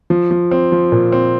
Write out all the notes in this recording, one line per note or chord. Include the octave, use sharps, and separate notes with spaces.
F3
F3
C4
F3
A#2
C4